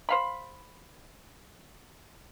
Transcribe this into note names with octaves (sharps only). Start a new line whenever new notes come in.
C5 F5 B5